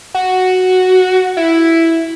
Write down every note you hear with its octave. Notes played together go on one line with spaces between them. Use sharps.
F#4
E4